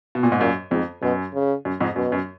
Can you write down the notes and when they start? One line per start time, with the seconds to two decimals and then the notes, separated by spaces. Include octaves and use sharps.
0.15 B2
0.23 A#2
0.32 G#2
0.40 F#2 A#2
0.71 F2 G#2
1.02 F#2 B2
1.34 C#3
1.65 F#2
1.80 F2 G#2
1.96 F#2 B2
2.12 F#2